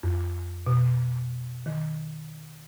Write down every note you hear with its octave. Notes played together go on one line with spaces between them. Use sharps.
F2
B2
D#3